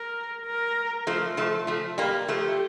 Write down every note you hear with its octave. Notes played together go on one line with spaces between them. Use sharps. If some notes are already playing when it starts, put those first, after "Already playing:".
Already playing: A#4
A#4
F3 A3
F3 A3
F3 A3
G3 A#3
F3 A3 G4